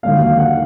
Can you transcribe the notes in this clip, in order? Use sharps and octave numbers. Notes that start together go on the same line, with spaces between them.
D#2 D3 F#3 A#3 F5
F5
F#5